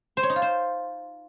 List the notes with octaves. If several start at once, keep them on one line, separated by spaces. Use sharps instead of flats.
C5
C#5
D#4
F4
C5